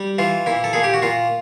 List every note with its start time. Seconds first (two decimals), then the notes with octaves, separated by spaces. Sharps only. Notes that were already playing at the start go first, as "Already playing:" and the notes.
Already playing: G3
0.18 E3 F4
0.46 A#2 E4
0.64 A4
0.73 A#2 G#4
0.83 G4
0.93 F#4
1.02 A#2 F4